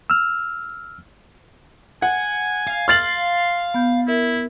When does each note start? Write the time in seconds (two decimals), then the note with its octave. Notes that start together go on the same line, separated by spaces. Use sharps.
0.10 E6 F6
2.02 F#5 G#5
2.67 F5
2.88 C6 F6 A6 F#7
3.74 B3 G6
4.08 E4 A#4 E5